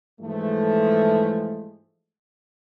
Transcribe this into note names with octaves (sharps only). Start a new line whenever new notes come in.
G#2 E3 F3 G#3 A3